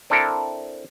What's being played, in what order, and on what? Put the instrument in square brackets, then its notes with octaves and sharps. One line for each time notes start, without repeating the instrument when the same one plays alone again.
[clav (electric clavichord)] C4 D4 E4 A4 A#4